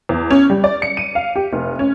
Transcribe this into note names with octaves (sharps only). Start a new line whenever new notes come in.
E2
C#4
G3
D5
C#7
D#7
F5
G4
F1
C#4